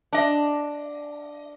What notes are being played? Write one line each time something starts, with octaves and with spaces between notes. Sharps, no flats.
D4 D#5